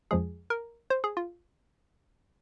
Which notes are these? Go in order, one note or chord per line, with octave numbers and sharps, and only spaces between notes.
F2 F3 G#3 G#4
A#4
C5
G#4
F4